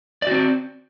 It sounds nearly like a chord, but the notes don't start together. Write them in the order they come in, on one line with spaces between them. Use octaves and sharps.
D5 F#4 C4